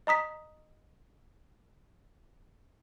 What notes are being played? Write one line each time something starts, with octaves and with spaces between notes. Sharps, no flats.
D#5 A#5 D#6 B6